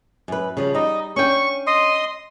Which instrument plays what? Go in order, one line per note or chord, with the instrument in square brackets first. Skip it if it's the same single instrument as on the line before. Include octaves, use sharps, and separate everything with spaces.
[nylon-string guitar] F#2 B4
C#3 F3 G3
[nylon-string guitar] G3 [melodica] D#4 D#5
[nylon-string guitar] C#4 D4 G5 [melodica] C#6
[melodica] D#5 C6 D#6